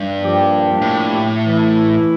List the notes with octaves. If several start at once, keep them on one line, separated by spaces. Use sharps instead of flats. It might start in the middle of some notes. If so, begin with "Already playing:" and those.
Already playing: G2
F3 A#3 D4 G4
A2
E3 A3 E4